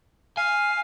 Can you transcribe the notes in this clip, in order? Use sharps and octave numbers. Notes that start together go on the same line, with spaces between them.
F5 G#5